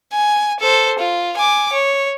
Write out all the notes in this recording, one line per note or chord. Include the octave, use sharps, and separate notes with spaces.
G#5
A4 C5
F4
G#5 D6
C#5